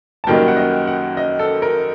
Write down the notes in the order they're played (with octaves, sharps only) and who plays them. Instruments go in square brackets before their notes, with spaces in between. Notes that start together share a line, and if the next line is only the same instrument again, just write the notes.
[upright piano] A5
F#2 D#3 G3 A#3 D#4 G5
F#5
D#5
F#5
D#5
A4
A#4